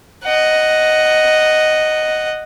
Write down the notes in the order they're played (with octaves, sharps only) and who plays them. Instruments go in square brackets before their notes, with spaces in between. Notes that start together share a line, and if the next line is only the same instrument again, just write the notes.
[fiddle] D#5 F#5